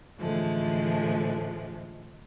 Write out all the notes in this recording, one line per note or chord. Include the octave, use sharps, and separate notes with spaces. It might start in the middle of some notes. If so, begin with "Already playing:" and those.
A2 D3 E3 F3 G#3 A3